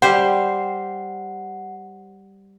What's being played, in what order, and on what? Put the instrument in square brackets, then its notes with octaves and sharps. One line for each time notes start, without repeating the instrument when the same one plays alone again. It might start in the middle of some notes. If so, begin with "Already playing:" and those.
[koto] G3 G4 C5 [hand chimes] F#5